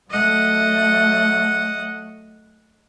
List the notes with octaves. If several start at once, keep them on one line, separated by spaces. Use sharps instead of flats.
F#3 A3 D#5 F#5